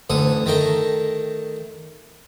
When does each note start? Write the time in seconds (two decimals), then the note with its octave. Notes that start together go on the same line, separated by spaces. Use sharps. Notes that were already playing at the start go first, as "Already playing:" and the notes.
0.10 A1 D2 A4 D#6
0.46 D#3 A3 G5 A#5